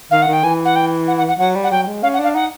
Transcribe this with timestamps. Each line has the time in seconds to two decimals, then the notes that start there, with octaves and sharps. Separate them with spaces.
0.11 D#3 F5
0.22 F#5
0.28 D#3
0.33 G5
0.43 E3 G#5
0.65 F#5
0.76 G5
1.08 F#5
1.18 F#5
1.29 F#5
1.39 F#3 F#5
1.55 G3
1.64 F#5
1.71 F#3 G5
1.87 G#3
2.03 C#4 F5
2.14 F#5
2.19 D4
2.24 F5
2.35 D#4 F#5